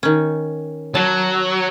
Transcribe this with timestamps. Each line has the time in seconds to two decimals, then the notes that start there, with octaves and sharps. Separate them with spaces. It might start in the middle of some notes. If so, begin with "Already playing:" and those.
0.03 D#3 C#4
0.95 F#3 A5